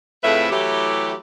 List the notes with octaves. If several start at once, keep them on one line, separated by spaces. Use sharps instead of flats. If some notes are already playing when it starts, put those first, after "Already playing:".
F2 A2 A3 G#4 B4 E5
E3 F#3 A3 E4 G4